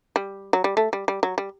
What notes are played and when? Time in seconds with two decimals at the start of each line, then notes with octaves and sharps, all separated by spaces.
0.16 G3
0.53 F#3
0.64 G3
0.77 A3
0.93 G3
1.08 G3
1.23 F#3
1.38 G3